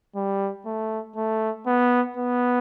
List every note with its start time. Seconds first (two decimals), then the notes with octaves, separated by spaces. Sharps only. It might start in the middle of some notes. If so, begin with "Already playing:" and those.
0.16 G3
0.66 A3
1.16 A3
1.67 B3
2.17 B3